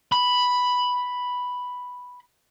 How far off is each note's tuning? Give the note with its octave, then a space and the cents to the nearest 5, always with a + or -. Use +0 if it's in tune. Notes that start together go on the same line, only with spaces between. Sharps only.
B5 +0